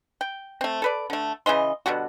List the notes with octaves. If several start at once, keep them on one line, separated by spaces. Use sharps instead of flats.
G5
A3 C4
A4 B4 D5
D3 A3
C#3 E3 D#5 C6
B2 D3 G3 F#4